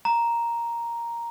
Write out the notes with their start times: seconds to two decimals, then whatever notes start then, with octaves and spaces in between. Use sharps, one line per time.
0.05 A#5